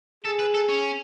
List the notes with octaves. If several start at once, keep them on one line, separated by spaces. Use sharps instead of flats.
G#4 A4
B4
A4
C#4